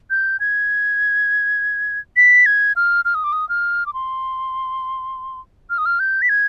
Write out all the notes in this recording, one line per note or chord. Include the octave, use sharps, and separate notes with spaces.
G6
G#6
B6
G#6
F6
F6
D#6
D6
D#6
F6
D6
C6
F6
D#6
F6
G6
B6
G#6